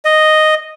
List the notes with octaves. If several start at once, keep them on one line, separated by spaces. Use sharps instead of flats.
D#5